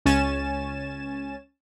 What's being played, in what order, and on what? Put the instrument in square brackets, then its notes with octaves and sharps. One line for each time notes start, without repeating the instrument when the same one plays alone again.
[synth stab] C#2 C#4 G#5 A6 E7